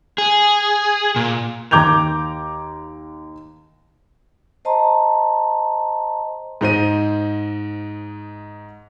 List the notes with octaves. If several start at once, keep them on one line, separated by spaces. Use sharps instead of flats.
G#4
A#2
D#2 A#5 D6 G6 G#6 F7
C5 D#5 A5 A#5 C6
G#2 D#4 C5 D#7